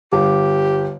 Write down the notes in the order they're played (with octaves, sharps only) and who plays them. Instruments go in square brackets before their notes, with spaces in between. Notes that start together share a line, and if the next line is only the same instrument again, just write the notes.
[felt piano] G1 [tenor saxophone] G4